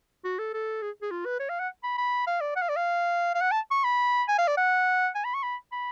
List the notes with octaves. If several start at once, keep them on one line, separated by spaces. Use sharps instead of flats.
F#4
A4
A4
G#4
G#4
F4
B4
C#5
F5
F#5
B5
B5
F5
D5
F#5
F5
D5
F5
F5
F#5
A5
C#6
B5
G#5
F5
D5
F#5
G#5
B5
C#6
B5
B5